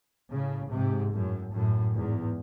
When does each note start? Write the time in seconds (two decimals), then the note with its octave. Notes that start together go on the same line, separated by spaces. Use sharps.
0.32 A2 C#3
0.73 G#2 C3
1.13 F#2 A2
1.54 F#2 A2
1.95 E2 G#2